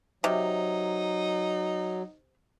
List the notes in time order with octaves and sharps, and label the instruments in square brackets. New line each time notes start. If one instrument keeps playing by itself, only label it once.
[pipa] C3 [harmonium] F#3 [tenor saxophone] D#4